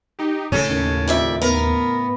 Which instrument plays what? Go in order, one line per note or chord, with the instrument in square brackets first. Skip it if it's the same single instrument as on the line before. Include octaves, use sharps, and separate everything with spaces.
[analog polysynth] D#4 G4
[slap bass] A2 C#3 [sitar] C#4 A4 [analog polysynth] D#7
[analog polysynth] D#2
[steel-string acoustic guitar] F2 D5 E5
[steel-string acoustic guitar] B3 [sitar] A#4